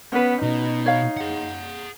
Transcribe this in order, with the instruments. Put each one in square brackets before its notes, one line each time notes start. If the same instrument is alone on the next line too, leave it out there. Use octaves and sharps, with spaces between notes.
[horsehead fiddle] B3 [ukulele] C#4 B4
[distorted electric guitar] B2 [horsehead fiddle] D#4
[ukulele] C#5 F5
[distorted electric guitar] G#4 F#5